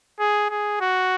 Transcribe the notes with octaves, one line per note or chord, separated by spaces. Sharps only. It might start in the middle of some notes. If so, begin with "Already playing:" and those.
G#4
G#4
F#4